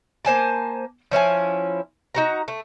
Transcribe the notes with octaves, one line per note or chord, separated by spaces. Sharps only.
A#3 C5 G#5 A5
F3 C#4 E4 G#5
D#4 F#4 A#5
A3